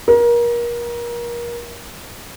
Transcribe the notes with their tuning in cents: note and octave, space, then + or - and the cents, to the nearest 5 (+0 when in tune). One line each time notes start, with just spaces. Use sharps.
A#4 +30